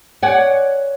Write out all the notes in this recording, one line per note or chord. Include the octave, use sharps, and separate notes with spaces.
C#5 D5 F#5 G#5